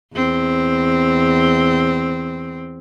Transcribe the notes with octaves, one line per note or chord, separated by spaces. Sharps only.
E2 C4